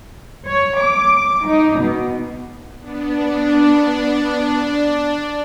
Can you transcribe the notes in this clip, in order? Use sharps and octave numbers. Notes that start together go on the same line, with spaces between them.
C#5
D6
D#4
B2
B3 D4